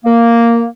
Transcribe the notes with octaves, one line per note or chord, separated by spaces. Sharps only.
A#3